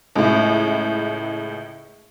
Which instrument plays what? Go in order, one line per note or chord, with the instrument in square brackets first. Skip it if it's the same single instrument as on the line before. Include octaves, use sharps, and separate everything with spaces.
[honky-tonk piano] C#2 A2